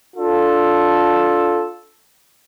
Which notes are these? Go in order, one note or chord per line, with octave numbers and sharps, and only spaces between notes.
D4 F4 A4